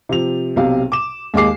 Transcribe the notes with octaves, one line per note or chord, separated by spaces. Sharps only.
C3 F3 F7
B1 C3 F5
D6 E7
D#2 G#3 A#3 G#4 D6 C7